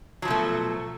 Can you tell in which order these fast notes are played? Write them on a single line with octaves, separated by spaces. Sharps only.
F#3 F3 B2 A3